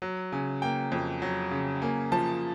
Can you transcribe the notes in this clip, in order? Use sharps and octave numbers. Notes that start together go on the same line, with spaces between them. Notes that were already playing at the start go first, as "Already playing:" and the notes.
F#3
C#3 G#5
A#3 G5
F2
F#3
C#3
A#3 G#5
F3 A5